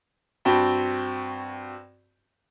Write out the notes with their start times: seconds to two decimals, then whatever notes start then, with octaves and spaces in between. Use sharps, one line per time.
0.45 G2 C4 F#4 G5 A5 B5